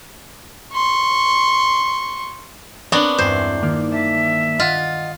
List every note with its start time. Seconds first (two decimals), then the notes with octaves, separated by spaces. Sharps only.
0.74 C6 C#6
2.92 B3 C4 D4 A#4 C#5
3.18 E2 G2 G#3 C5
3.63 D#3 A#3
3.92 E5 A5
4.60 F4 D#5 F#5